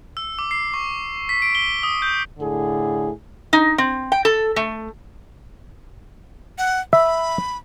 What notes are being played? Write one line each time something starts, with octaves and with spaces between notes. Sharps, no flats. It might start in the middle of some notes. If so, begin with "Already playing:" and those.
E6
D6
C7
C#6
B6
D7
G7
D#6
G6
A2 D3 G#4
D#4
C4
G5
A4
A3
F#5
E5 B5